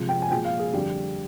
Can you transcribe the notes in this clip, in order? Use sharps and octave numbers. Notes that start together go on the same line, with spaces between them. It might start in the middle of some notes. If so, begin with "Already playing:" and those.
Already playing: C3 F3 G#3
G5
G#5
A#2 F3 G#3 G5
F5
G#4
F2 D3 G3 G4